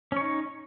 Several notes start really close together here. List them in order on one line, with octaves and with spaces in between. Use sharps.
C#4 C#5 D#4